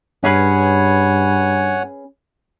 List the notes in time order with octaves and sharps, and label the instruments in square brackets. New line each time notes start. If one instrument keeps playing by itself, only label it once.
[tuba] G2 [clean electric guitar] C#4 G#4 B4 [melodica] C#5 F#5 G#5